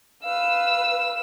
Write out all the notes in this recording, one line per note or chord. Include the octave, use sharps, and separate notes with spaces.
B4 F5 E6